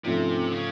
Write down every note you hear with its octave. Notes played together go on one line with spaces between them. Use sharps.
G#2 C3 F3 A3 C#4
C#3